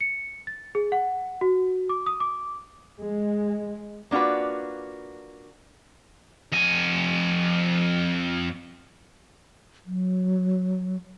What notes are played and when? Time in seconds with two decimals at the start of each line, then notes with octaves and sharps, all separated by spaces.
0.01 C#7
0.47 A6
0.75 G#4
0.92 F#5
1.41 F#4
1.89 D6
2.06 D#6
2.20 D6
3.00 G#3
4.11 A#3 D4 F4 F#4 B4
6.53 F2 G#5
9.86 F#3